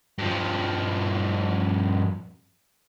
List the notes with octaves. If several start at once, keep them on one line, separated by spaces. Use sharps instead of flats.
G2 F3